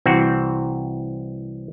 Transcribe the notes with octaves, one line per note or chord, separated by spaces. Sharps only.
C2 E3 C4 F#4